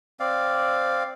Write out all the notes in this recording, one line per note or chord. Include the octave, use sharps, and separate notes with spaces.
C4 D5 F5